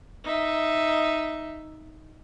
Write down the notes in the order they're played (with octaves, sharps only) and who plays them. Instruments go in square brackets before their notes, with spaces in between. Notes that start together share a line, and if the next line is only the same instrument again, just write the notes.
[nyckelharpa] D#4 E5